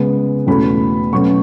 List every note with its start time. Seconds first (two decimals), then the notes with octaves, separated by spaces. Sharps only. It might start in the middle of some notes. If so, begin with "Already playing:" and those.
Already playing: C#3 G#3 B3
0.47 E2 B2 A3 C#4 B5
1.13 B2 F#3 A3 C#4 C#6